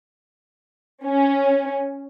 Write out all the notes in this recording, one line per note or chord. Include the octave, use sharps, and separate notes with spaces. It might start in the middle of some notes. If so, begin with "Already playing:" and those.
C#4